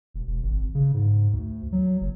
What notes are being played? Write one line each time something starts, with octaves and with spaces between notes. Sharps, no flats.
E1
E1
G#1
C#3
G#2
D2
F#3
F#1